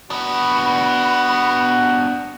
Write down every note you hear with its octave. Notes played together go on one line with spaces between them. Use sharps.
B3 D4 F#4 B5